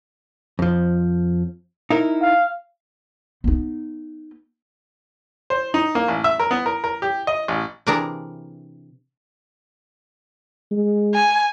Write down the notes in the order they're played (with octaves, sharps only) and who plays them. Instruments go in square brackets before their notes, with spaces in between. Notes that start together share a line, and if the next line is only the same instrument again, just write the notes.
[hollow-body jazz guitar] F2 F3
D#4 E4 A#4
[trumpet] F5
[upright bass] B3 D#4
[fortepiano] C5
D#4
A#3
A1
E5
A#4
B3
A#4
A#4
G4
D#5
A1
[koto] C3 E3 D4 G#4 A#4 A#5
[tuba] G#3
[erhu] G#5